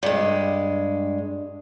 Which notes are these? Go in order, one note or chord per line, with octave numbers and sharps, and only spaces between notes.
G2 G#3